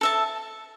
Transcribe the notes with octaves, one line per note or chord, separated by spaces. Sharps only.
A4 E5 A5